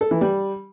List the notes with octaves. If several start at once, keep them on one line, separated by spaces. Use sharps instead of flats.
A4
E3
G3